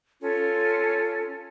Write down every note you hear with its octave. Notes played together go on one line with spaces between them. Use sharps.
C#4 F4 A4